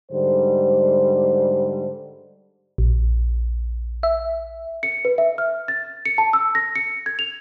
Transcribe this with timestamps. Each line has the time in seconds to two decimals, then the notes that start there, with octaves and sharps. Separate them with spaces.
0.11 G#2 D3 G3 C5
2.78 A#1
4.03 E5
4.83 C#7
5.05 B4
5.18 E5
5.38 F6
5.68 A6
6.05 C#7
6.18 A5
6.33 E6
6.55 A#6
6.76 C#7
7.06 G#6
7.19 F7